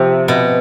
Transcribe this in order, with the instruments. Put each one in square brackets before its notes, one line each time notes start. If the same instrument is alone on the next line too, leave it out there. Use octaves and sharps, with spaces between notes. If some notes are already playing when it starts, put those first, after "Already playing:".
Already playing: [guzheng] C3 [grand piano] F3 C4 G4
[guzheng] B2